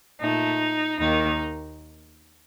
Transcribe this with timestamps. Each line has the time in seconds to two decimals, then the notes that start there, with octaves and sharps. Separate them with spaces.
0.20 A#2 A3 D#4
0.99 D#2 D#3 A#3 D#4